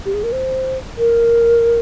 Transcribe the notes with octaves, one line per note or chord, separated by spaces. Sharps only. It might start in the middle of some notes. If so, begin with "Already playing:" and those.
G4
G#4
A#4
C5
A#4